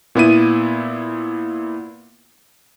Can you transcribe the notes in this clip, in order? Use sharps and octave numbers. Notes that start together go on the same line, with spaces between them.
A#2 B3 E4 D#7